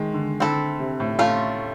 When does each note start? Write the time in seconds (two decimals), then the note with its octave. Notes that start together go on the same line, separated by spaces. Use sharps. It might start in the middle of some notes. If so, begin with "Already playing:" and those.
Already playing: D#3 G#3
0.14 D3
0.40 D3 C4 E4 A4
0.79 C3
1.00 A2
1.18 A2 A3 C#4 F4